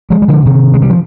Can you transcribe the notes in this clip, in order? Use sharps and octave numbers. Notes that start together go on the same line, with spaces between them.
F3 G#3
G3
D3 F3
C3 D#3
G#3
G3
F3